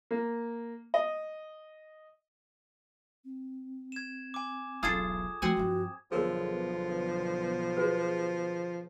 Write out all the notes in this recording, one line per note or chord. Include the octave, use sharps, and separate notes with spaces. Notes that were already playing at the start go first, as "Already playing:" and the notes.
A#3
D#5
C4
G#6 E7
G#5 D6
E1 B1 F4 G#4 A4 D#6 G#6
F3 A3 C4 F#4 F#5 G#5
G2 F3
B1 D3 F3 B3 G#4 A#4 C#5
F#4 G#4 B4